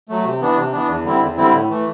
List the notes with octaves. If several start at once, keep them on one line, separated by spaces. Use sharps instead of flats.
F#3 A3
C3
E3 B3 D4
C3
E3 B3 D4
E2
D3 G3 C4 E4
E2
D3 G3 C4 E4
A2
E3 A3